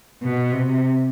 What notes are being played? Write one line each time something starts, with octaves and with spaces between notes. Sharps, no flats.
B2
C3